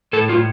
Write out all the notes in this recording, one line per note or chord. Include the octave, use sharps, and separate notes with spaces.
A2 A4
F4
A2